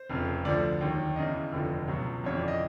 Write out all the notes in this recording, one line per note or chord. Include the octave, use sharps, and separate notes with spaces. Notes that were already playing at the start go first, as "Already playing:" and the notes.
Already playing: C5
F1 F2 C#3
D2 D3 F3 D5
D#2 D#3 F#3
E2 C#3 E3 D#5
F1 D#2 D3 F3
C#2 B2 F#3
G1 F2 C#3 E3 C#5
D5
D#5